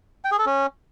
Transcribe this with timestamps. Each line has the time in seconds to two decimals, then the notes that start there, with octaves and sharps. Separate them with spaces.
0.25 G5
0.32 G#4
0.39 A4
0.46 C#4